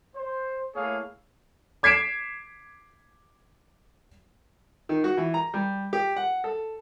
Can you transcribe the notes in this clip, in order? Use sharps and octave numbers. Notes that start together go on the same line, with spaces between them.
C5
A3 A#3 E4 G#4 C#5 F5
D6 G#6 B6 C7 D7 E7
D#3
F#4
E3
A#5
G3
G4
F#5
A4